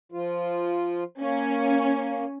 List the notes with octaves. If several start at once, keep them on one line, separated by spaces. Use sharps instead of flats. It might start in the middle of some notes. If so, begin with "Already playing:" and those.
F3 F4
A#3 C#4